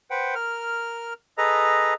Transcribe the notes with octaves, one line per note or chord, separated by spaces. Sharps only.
B4 C5 F#5 G5
A#4 F6
G#4 A4 B4 D#5 A#5